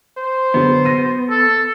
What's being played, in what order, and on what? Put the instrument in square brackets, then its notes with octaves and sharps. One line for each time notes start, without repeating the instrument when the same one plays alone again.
[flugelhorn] C5
[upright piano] D3 F#3 [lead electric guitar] B3
[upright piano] A#6 D#7
[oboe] A4